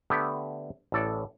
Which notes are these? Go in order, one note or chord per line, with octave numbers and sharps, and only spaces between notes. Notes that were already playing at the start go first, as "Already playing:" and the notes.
D3 A3 B3 G4
A1 A2 A4 D5